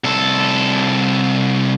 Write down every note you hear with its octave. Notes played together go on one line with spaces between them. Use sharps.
C2 A4